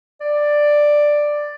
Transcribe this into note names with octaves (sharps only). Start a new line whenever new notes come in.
D5